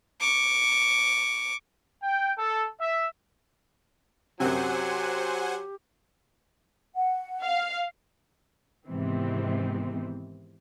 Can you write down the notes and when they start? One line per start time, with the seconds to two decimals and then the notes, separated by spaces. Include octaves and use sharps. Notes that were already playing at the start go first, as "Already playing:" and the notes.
0.21 C#6 D6
2.03 G5
2.38 A4
2.81 E5
4.40 F#2 C3 F#3 G4 C5 F#5 G#5
6.95 F#5
7.42 F5
8.87 G#2 C3 D#3 E3 B3 C4